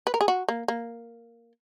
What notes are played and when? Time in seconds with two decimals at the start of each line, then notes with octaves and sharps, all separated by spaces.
0.07 B4
0.14 A#4
0.21 G#4
0.28 F#4
0.48 A#3
0.68 A#3